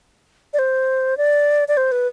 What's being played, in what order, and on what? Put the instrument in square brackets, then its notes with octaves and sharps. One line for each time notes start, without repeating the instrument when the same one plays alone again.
[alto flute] D5
C5
D5
D5
C5
B4